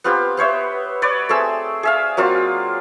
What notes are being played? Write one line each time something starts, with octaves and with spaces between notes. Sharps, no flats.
B3 C4 F4 G4
B3 C5 C#5 E5
B4 C#5 D5
A3 C4 G#4 E6
G#4 E5 F5
F#3 A#3 C4 F4